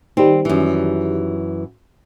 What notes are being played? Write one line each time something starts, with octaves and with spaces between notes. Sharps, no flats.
D#3 G3 C4
F#2 E3